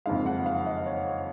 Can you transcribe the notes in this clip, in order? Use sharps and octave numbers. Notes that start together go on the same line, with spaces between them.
F#1 F2 D#3 G#3 F5
F#5
F5
D#5
C#5